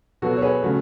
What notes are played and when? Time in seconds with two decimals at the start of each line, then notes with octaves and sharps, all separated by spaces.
0.22 B2 F#3 B3 F#4 A4
0.37 C#5
0.42 G#4 B4
0.63 C#3 F#3 A3